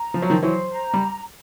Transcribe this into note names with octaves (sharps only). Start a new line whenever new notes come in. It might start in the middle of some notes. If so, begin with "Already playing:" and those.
Already playing: A#5
F3 C5
F#3
D#3 F3
E3 F#3 C5
A#5
G3